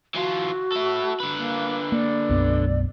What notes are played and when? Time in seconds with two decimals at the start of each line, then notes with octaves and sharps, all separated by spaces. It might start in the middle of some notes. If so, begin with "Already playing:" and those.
0.15 E3 F4 F#4
0.72 E4 A4
1.20 D3 B4
1.37 A#3
1.92 A#3 D5
2.29 B1 F#2 B3